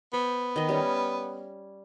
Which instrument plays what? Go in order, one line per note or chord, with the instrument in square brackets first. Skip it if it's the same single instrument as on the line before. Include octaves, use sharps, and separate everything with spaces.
[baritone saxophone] B3 [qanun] C5
[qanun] D#3 D#5
G3 C#4